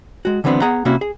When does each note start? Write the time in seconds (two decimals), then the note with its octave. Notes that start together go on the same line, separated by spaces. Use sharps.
0.25 G#3 F#4
0.44 D3 E3 F#3 B3 C4 D4
0.61 B3 G#4 F#5 A#5
0.85 C3 A#3 C#4 E4 F#4
1.01 G#4